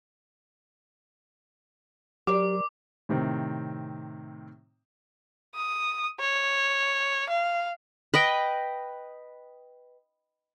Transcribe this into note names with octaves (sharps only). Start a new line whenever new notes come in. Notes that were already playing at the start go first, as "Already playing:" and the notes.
F#3 G4 A#4 C5 D5 D6
A2 C3 D#3 C4
D#6
C#5
F5
B4 D#5 G5